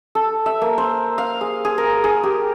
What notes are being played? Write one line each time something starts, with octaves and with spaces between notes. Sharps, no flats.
A4
E5
A#3
C5
F5
G#4
G#4
A#4
G#4
G4